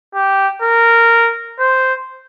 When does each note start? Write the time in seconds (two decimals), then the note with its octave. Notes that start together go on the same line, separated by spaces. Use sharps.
0.15 G4
0.62 A#4
1.60 C5